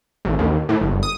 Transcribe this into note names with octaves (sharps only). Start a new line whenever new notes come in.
A1
D#2
A2
G1
D#6